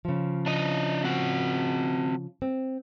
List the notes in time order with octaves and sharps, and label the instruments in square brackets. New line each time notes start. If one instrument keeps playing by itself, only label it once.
[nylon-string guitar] C#3 F3
[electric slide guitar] D4 D#5
C4 F#4 F#5
[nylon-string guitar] C4